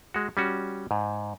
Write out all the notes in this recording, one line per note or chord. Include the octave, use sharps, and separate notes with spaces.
G#3 F#4
G3 C#4 F#4
G#2